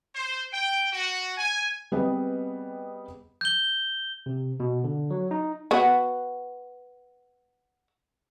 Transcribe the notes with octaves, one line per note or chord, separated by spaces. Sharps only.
C5
G5
F#4
G#5
G3 B3 C4 G#4 B4 D#5
G6 G7
C3
B2
D3
F#3
D#4
B3 F#4